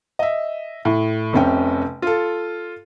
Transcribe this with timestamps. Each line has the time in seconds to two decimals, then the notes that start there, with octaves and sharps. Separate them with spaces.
0.19 D#5 E5
0.85 A2
1.33 F1 C3 C#4 G5
2.02 F4 A4